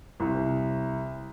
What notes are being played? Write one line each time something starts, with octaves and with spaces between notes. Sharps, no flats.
C2